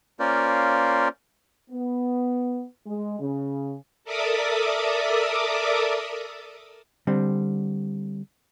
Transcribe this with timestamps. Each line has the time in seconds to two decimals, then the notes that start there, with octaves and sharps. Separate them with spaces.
0.20 A#3 C#4 F4 A#4 C5 D5
1.70 B3
2.86 G#3
3.19 C#3
4.04 A4 A#4 D5 E5 D6 D#6
7.07 D3 G3 C4